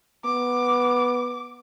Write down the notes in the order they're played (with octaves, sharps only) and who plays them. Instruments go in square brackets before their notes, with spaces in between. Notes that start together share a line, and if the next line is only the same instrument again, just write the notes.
[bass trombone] B3 [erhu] D6